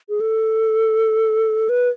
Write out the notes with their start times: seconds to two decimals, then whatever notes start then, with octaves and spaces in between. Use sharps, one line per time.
0.09 G#4
0.20 A4
1.69 B4